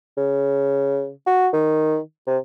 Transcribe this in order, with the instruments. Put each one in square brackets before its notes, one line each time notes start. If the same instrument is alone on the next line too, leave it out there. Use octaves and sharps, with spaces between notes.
[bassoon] C#3
F#4
D#3
C3